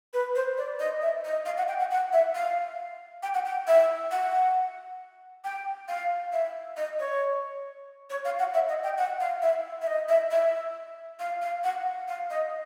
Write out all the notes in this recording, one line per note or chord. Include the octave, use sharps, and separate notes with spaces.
B4
C5
D5
D#5
E5
D#5
F5
F#5
G5
F#5
F#5
E5
F5
G5
F#5
G5
E5
F#5
G5
F5
E5
D#5
C#5
C#5
F5
F#5
E5
D#5
G5
F#5
F5
E5
E5
D#5
E5
E5
F5
F5
F#5
F5
D#5